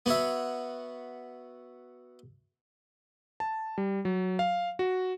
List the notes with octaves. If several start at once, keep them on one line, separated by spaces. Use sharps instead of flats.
B3 F#4 C#5 E5
A5
G3
F#3
F5
F#4